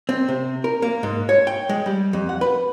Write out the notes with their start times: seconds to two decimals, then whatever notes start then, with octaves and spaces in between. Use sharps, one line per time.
0.09 C4
0.28 C3
0.64 A#4
0.82 A#3
1.03 G#2
1.29 C#5
1.47 G5
1.69 G#3
1.86 G3
2.13 F2
2.29 F#5
2.41 B4